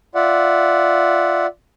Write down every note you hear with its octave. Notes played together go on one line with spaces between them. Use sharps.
F4 D5 E5 F#5